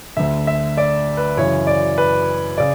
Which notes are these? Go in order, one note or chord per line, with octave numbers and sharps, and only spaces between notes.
D2 D3 E5
E5
D5
B4
F#2 C#3 E3 C#5
D5
B4
C#3 D5